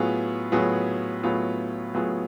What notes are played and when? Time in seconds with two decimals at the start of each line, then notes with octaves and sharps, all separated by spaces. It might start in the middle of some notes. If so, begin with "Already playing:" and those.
Already playing: A2 F#3 B3 F4 G#4
0.52 A2 F#3 B3 F4 G#4
1.23 A2 F#3 B3 F4 G#4
1.94 A2 F#3 B3 F4 G#4